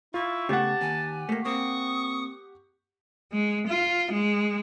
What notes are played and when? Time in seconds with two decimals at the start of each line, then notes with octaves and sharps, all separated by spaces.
0.14 E4 F4 C#6
0.49 C#3 A3 B3 G4 F#5 A5
0.81 D#2 G#5
1.29 A3 A#3
1.45 A#3 C4 C#6 D#6
3.31 G#3
3.67 F4
4.12 G#3